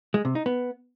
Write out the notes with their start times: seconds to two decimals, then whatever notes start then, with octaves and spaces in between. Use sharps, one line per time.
0.14 G#3
0.25 C3
0.35 D#4
0.46 B3